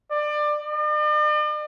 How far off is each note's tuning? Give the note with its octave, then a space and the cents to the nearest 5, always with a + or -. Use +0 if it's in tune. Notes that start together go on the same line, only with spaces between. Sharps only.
D5 +25
D5 +45